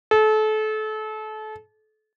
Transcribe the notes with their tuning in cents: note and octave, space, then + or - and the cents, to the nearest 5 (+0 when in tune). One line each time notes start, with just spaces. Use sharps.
A4 -30